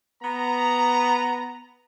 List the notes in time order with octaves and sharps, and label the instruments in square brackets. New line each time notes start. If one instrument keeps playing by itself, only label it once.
[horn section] B3 A#5